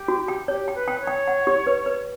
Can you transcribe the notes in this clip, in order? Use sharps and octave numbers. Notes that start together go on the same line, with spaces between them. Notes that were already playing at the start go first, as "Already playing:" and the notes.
Already playing: G4
F#4
G5
G4 C#5
G5
B4
G5
C#5
G5
F#5
G4
B4
B4